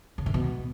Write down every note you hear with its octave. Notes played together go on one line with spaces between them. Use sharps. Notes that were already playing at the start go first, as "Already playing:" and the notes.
C#3
D3
B2